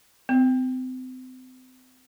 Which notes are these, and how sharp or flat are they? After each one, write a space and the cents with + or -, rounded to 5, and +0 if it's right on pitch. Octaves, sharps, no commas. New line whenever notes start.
C4 -35